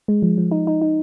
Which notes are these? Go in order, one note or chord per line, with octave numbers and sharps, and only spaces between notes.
G#3
F3
F3
D#4
D#4
D#4